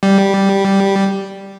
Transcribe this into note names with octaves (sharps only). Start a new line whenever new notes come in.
G3